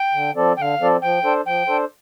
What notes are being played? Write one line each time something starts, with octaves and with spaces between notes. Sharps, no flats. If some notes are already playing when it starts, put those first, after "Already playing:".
Already playing: G5
D3
F3 C4 A4 D5
D3 F5 G5
F3 C4 A4 D5
F3 G5
D4 A4 C5
F3 G5
D4 A4 C5